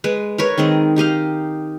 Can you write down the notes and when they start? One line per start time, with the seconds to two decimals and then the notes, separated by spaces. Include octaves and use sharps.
0.04 G#3 B4
0.38 A#4 B4 C#5
0.58 D#3 G#3 C4 D#5
0.96 D#4 G4 D#5 F5